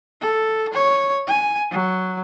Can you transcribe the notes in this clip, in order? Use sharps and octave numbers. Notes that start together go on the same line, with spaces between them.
A4
C#5
G#5
F#3